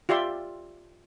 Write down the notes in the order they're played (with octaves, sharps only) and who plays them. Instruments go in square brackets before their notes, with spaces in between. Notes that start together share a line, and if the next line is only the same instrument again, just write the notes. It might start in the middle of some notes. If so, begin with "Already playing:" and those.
[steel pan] F4 G4 D5 E5 C6